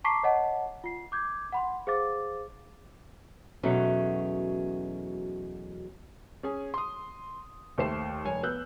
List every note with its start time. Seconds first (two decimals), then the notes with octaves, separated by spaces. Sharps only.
0.04 A5 A#5 C#6 D6 B6 C7
0.23 C#5 D#5 F#5 A5
0.84 F4 C7
1.12 D6 G6 G#6
1.52 F#5 B5 C6
1.87 G#4 C5 F5 D6 A6
3.63 E2 B2 F#3 A3 C#4
6.43 C#4 G#4 G#5
6.74 C6 D#6
7.78 D#2 A3 C5 C7 E7
8.25 F1 C#5 G#5
8.43 B3 E6 F#6 G6